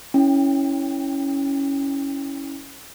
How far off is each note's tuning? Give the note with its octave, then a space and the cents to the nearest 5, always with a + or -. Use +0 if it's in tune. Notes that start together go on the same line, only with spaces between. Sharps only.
C#4 +0 E4 -20 G5 +30